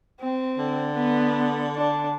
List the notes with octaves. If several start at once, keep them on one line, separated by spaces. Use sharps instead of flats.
C4
D3
B3
D4